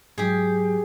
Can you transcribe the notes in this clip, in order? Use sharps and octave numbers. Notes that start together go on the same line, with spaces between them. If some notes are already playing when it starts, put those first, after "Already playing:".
G#2 F#3 G4 G#4